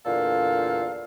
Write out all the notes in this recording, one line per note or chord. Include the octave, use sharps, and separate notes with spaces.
E2 A#2 D3 A4 F5